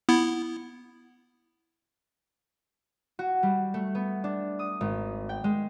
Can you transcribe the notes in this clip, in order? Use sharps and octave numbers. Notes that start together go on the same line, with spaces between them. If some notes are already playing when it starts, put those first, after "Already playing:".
B3 E4
F#4
G3
A3
B3
D4
D#6
G#1
G5
G#3